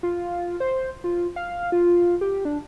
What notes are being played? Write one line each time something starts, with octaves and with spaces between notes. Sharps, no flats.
F4
C5
F4
F5
F4
G4
D4